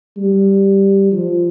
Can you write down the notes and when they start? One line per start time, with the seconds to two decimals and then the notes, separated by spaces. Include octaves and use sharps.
0.17 G3
1.12 F3